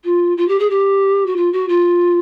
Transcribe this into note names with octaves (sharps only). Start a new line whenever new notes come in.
F4
F4
G4
G#4
G4
F#4
F4
F#4
F4